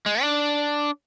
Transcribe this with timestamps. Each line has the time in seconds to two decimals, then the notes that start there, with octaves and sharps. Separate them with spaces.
0.06 G#3
0.22 D4